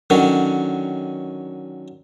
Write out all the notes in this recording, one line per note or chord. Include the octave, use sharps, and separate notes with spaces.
D3 D#3 F#3 C#4